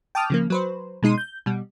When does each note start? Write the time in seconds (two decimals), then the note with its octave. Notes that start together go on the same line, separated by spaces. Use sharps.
0.15 G5 A5 D6 D#6 F6
0.30 C#3 F3 A#3
0.50 F#3 B4 C5
1.02 B2 G#3 D#4 C6 D#7
1.18 G6
1.46 B2 G3